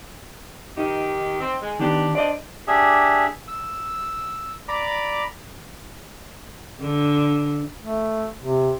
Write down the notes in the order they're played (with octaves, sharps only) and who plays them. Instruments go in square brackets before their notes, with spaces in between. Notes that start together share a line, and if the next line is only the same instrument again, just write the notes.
[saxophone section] D#3 G4 [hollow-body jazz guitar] D#4
[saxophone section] C4
G#3
[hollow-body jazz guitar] D#3 B3 [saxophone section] D4 G4
[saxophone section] D4 C5 [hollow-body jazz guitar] D5 D#5
[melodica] D4 G4 G#4 E5
E6
D5 A#5 B5 D6
[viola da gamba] D3
[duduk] A3
C3